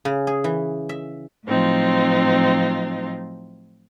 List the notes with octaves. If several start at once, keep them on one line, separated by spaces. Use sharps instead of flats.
C#3
G#4
E3
E5
A2 F3 F#3 C4 D#4 F4